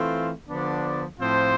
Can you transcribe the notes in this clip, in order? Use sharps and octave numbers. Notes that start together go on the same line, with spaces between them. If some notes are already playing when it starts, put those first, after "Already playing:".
Already playing: E3 A3 C4 F4
D3 F3 B3 D4
A2 F3 C4 F4 C5